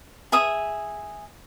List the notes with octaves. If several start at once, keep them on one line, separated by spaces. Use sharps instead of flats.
G#4 E5 D#6